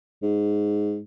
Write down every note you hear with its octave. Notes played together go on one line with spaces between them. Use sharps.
G#2